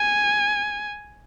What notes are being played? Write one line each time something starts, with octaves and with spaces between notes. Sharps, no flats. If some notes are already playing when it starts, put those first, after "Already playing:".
Already playing: G#5